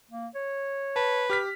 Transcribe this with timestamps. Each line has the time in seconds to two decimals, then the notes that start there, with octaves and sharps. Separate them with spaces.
0.11 A#3
0.35 C#5
0.96 B4 A5
1.30 G4 F6 B6